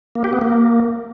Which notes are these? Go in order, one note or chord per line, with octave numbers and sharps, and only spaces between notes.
A#3
G4
B3
A#3